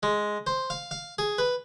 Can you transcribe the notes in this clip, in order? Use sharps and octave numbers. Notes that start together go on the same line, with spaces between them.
G#3
C5
F5
F5
G#4
B4